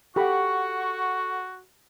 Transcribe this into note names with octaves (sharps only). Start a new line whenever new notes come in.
F#4 G4 A4 F#5 G5 B5 C#6